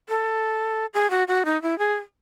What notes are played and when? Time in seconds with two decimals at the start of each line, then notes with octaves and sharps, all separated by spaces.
0.09 A4
0.94 G#4
1.10 F#4
1.28 F#4
1.45 D#4
1.62 E4
1.78 G#4